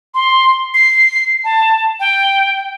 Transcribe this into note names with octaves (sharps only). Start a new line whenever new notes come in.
C6
C7
A5
G5